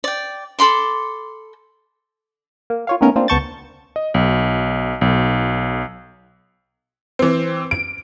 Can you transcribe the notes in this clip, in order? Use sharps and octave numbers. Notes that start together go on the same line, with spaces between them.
D5 G5
A4 B5 C6 D6
A#3
F4 C#5 F5
D#3 A3 B3 C#4 A#4
A#3 C4 D4 F4
C#2 B3 A5 C#6 G6 A6
D#5
B1
B1
E3 C4
D7